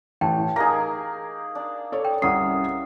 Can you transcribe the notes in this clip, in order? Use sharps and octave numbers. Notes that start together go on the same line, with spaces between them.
A1 G5 A5
A#3 D#4 G#4 A#5 A#6
D4
A4 C#5 D5
G5
C2 C#4 F#5 D#6 C7